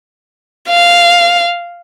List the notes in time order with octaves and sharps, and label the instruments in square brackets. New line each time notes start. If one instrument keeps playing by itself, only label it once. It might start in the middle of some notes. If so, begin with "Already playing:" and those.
[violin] F5